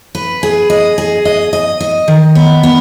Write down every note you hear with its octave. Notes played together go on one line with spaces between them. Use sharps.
B4
G#4
D#5
G#4
D#5
D#5
D#5
D#3
B3
B3